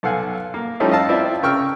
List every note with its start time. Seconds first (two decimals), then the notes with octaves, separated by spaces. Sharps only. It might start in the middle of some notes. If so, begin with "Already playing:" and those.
0.03 B1 A4 F5 F#5 G#5
0.54 A#3
0.80 F3 G3 A3 C#4 D#4 E4
0.91 D#5 F5 A5 E6
1.09 C4 E4 F4 D5 E5
1.43 C#3 A#4 G5 C#6 E6 F6